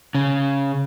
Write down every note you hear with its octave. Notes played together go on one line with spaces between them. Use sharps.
C#3